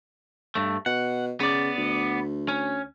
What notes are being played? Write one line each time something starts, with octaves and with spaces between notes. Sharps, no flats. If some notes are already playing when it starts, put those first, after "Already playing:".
G2 A3
B2 F#5
C#3 B3 D5
D2
C#4